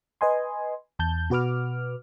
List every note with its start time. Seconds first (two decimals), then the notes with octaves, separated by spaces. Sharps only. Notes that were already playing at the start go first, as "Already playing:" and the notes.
0.21 B4 D#5 G#5 C6
0.99 E2 A5 G6
1.30 B2 F#4 B4 D6 F6